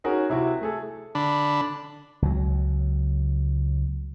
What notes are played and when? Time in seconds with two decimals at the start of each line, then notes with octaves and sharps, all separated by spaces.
0.04 C#4 D#4 F#4 G#4 A#4
0.30 C3 E4 F#4
0.61 A3 G#4 A4
1.15 D3 D4 B5
2.22 C#2 F#3